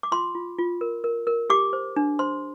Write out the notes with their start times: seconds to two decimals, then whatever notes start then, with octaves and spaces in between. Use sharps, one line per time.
0.03 D6
0.12 F4 C6
0.35 F4
0.59 F4
0.81 A#4
1.04 A#4
1.27 A#4
1.50 G4 D6
1.73 C5
1.96 D4
2.19 C5 C6